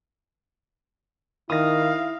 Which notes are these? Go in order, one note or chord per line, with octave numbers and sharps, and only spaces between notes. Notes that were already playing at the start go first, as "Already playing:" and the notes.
D#3 E4 F5 D#6 A#6